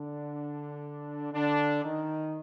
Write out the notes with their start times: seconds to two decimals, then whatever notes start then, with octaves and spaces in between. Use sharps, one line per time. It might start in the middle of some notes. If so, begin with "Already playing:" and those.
Already playing: D3 D4
1.33 D3 D4
1.84 D#3 D#4